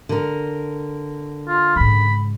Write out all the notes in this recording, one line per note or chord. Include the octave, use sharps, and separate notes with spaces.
D3 A#4
F4
G#2 C#3 B5